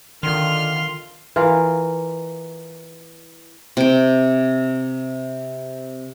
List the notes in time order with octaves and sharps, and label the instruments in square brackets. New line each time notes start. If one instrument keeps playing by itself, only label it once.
[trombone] D3 [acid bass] D#3 [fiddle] F4 F6 [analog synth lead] C6
[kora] E3 F4 A#4
[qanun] C3 G5